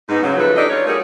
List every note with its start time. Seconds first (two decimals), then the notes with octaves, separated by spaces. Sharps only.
0.09 G#2 B3 D#4
0.23 F#2 C#3 F#3
0.38 G#2 F3 A3 A4 B4
0.56 D4 D#4 G4 A4 D5 D#5
0.70 D#4 F4 C#5
0.86 G3 A3 D#4 F#4 G#4 A#4